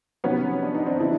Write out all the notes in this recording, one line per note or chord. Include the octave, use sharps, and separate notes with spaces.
C3 D#3 F#3 B3 C#4
D4
D#4
C4 D4
C#3 E3 D4 E4